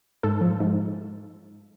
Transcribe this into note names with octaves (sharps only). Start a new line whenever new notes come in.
G#2 A4
F3
G#2